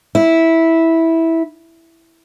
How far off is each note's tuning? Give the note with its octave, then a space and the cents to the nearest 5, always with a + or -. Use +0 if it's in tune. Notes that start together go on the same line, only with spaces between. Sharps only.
E4 -10